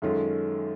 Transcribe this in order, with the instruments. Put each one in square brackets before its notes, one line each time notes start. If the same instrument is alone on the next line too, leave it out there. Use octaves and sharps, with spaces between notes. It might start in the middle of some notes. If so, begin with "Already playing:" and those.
[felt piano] F#2 D#3 G#3 C#4 F4 [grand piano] A4